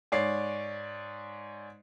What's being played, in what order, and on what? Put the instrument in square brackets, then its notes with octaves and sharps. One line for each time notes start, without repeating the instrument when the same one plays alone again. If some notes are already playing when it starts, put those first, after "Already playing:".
[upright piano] G#2 C#5 D5 C7